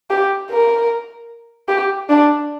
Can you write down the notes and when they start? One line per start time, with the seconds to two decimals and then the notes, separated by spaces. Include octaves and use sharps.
0.10 G4
0.50 A#4
1.69 G4
2.09 D4